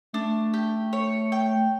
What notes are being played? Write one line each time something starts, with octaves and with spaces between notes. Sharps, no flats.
A3 D4
G4
C#5
G5